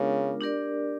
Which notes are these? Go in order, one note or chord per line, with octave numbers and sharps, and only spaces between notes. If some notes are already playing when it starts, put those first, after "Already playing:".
Already playing: C#3 G#3 B3 D4 F4 A#4
D4 G4 A#4 D5